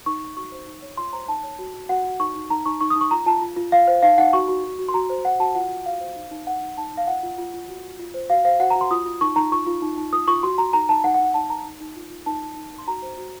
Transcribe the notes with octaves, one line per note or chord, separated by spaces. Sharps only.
D#4 C#6
D#4
F#4 C#6
C5
D#4
C#5
F4 C6
C5 A#5
D#4 A5
C#5
F#4
F#4
F#4 F#5
F#4
D#4 C#6
D#4
D#4 A#5
D#4 C#6
D#4 C#6
D#6
D#4
C#6
F4 A#5
F4 A5
F4
F4
F4 F5
C5
D#4 F5
D#4 F#5
F#4 C#6
F#4
F#4
F#4
C6
F#4 A#5
C5
F#4 F#5
F#4 A5
F4 F#5
F4
F#4 F5
C5
D#4
D#4
D#4 F#5
D#4
D#4 A5
D#4 F5
F4 F#5
F4
F4
F4
F#4
F#4
F4
C5
F#4 F5
C5 F5
F#4 F#5
A#5
F#4
C6
F4 D#6
F4
D#4 C#6
D#4 A#5
F4 C#6
F4
D#4
D#4
F4 D#6
F4 C#6
F#4 C6
F#4 A#5
D#4 A#5
D#4 A5
D#4 F#5
F#5
D#4
F#5
D#4 A5
D#4 A#5
D#4
D#4
F4
F4
D#4 A5
D#4
D#4
D#4
C6
F#4 A#5
C5
F#4